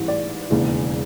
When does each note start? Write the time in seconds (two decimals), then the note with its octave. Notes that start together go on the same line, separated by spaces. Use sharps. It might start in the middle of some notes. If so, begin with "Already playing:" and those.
Already playing: A1 G#2 E3 G3
0.08 D5
0.50 E1 D#2 C#3 E3